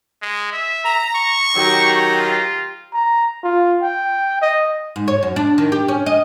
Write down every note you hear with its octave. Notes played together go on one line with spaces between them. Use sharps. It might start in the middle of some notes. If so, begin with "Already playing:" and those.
G#3
E5
A#5
C#6
D#3 F#3 G4 A#5
F4
A#5
F4
G5
D#5
G#2
C#5
F#2
D4
D#3
G4
C#4
D#5